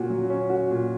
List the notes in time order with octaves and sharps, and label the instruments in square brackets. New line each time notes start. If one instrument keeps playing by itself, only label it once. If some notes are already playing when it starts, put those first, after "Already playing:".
Already playing: [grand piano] A#2 C#4 F#4
F#3
C#4
F#4
A#2